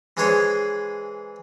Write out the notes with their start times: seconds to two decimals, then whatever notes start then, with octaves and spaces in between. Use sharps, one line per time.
0.17 E3 G#3 D4 G#4 C5 C#5